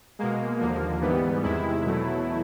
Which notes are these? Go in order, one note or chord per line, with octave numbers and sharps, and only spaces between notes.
B2 G#3 A#3
D#2 D3 F3 A#3
G#2 E3 G3 B3
E2 C3 D#3 G#3 E4
E2 B2 F#3 A3